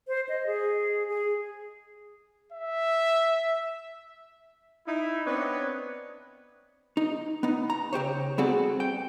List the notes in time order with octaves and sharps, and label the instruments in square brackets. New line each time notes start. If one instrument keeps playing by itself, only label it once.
[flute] C5
D#5
G#4
G#4
[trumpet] E5
[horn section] D#4 E4
B3 C4 D4 B4 C#5 D#5
[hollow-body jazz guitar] D#4
B3 D#4
A#5
C#3 G4 C5 C#5
G3 B3 C4 F#4 G#4 A4
G5